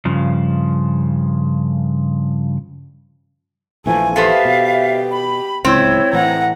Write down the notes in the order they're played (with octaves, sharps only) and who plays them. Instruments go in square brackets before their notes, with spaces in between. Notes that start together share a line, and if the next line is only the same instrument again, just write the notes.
[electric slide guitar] G2 C#3 F3
[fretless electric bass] A#1 E3 F3 [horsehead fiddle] A3 G#5
[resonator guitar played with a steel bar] B3 A4 C5 [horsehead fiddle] G4 [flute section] E5 F5
[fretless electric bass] B2
[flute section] B5
[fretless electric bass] D1 C#2 [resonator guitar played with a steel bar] C4 [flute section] E4 C#5
[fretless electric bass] A2 E3 [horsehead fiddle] F#5 A#5